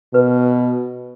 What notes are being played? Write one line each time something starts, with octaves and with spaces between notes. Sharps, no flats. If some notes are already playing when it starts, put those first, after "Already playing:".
B2 B4